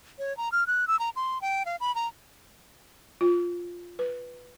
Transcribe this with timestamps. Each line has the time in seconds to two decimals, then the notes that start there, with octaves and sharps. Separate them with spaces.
0.19 C#5
0.37 A#5
0.52 F6
0.67 F#6
0.88 E6
0.99 A#5
1.16 C6
1.42 G5
1.66 F5
1.80 B5
1.95 A#5
3.21 F4
3.99 B4